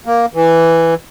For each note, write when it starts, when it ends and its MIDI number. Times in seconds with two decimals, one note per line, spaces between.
0.06 0.26 58
0.34 0.94 52